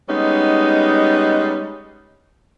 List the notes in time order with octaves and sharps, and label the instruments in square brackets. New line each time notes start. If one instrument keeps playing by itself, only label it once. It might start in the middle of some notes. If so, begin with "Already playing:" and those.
[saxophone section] G3 G#3 B3 C#4 D#4